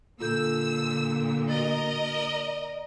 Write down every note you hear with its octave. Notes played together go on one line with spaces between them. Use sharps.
A#2 D3 F4 A4 E6 G6
F#4 A#4 D#5 A6
D5